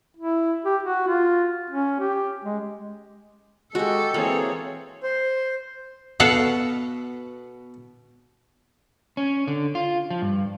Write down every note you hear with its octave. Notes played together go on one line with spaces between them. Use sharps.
E4
G4
F#4
F4
C#4
G4
G#3
G#3 F#4 G4 A4
E3 A#3 C4 G#4 C#5
C5
B2 A4 F5 F#5
C#4
D3
F4
F3
G2